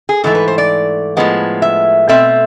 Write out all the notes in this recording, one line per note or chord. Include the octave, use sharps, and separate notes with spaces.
G#4
G#2 E3 A3 A4
B4
C5
D5
A2 F3 G#3 B3
E5
B2 A3 C4 E5